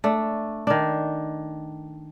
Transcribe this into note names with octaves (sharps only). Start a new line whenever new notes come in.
A3 D4
D#3 D4